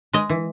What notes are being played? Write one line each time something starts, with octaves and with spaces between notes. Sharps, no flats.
G#3 D#5
E3